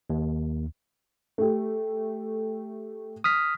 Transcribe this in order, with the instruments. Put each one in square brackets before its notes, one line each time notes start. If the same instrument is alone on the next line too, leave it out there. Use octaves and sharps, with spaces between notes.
[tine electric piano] D#2
[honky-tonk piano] A3 G4
[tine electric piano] D#6 F6 B6